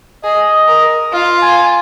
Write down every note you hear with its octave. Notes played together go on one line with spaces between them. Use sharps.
G#4 D#5
A#4
F4 F5
G#5